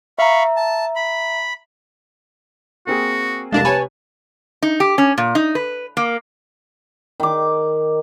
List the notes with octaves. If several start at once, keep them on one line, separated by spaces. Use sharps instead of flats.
E5 F5 A#5 B5 C#6
A5
B5
A#3 C4 F#4 G#4
F1 C2 G#3 D4 A#4 F5 A5
C3 B4 C#5 G#5
D#4
G4
C#4
A#2
D#4
B4
A#3
D#3 D6